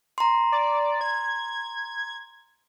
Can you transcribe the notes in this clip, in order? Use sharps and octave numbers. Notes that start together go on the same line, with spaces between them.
A#5 C6
D5
G#6